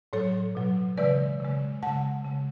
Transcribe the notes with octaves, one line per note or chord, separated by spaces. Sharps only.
A2 F#3 A4 C#5
B2 F#3
C#3 E3 G#3 B4 D5
C#3 G#3
C#3 G#3 F#5 A5
C#3 G#3